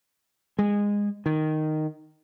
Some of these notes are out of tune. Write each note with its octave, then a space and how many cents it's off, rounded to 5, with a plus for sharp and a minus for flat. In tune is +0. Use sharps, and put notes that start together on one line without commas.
G#3 -20
D#3 -5